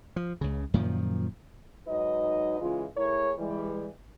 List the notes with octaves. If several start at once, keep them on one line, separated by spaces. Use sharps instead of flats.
F3
C#2 C#3
F#2 A#2 D#3 F3
G#2 F#3 D#4 B4 D#5
C#3 E3 G#3 F4
A2 E4 G#4 A#4 C#5
E3 G3 G#3